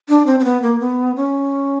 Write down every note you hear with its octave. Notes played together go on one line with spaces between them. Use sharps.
D4
C4
C4
B3
A#3
B3
C#4